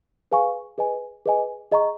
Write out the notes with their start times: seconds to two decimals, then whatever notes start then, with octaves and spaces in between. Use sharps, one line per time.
0.32 G#4 B4 F5 G#5 C#6
0.78 G#4 B4 D#5 G#5
1.26 G#4 B4 D#5 G#5
1.71 G#4 D#5 A#5 C#6